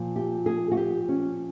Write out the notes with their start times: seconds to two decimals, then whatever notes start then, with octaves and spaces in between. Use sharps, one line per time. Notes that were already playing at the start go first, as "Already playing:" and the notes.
Already playing: A#2 F3
0.16 G4
0.46 G#4
0.72 F#4
0.77 G4
1.09 C#4